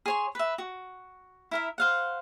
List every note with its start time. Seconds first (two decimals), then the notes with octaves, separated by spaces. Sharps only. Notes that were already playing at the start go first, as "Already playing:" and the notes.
0.06 G#4 C#5 C6
0.35 B4 E5
0.58 F#4
1.51 E4 A#4 E5
1.78 C5 F5 F#5